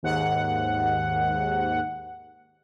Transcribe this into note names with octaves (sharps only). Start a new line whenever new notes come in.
D#2 G#2 F#5